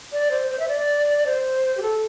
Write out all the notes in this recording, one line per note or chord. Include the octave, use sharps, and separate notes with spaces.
D5
C5
C5
E5
D5
C5
G4
A4